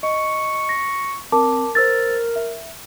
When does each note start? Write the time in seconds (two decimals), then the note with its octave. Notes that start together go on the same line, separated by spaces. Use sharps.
0.03 D#5 C#6
0.69 A#6
1.32 C4 A#4 A5 D6
1.75 A#4 C5 E6 A6
2.36 E5